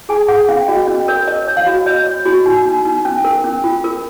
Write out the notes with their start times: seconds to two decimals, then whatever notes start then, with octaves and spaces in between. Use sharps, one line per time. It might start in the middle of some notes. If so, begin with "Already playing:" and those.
0.09 G#4 G#5
0.28 G#4 F#5
0.49 C#4 F5
0.68 F#4 D#5
0.87 C#4 D#5
1.08 A#4 C#5
1.27 C#5 D#5
1.48 C#5
1.57 F5
1.66 F#4
1.86 C#5 D#5
2.07 C#5
2.25 F#4
2.46 D#4
2.66 D#4
2.85 D#4
3.05 C#4
3.24 A#4
3.44 C#4
3.64 F4
3.84 A#4